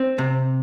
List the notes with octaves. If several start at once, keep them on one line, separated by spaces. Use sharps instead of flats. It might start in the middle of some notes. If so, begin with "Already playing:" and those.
Already playing: C4
C3